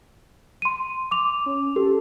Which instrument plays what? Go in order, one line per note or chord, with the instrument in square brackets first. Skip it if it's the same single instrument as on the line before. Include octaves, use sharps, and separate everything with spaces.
[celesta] C6 D#7
D6 F7
[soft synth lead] C#4
[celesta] G4 [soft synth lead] A4